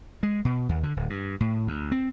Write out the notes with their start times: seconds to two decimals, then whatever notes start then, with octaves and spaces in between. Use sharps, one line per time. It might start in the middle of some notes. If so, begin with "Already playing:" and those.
0.23 G#3
0.45 B2
0.69 D#2
0.83 D3
0.96 D1
1.10 G2
1.40 A2
1.67 D2
1.92 C4